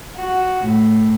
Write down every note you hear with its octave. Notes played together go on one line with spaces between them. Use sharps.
F#4
A2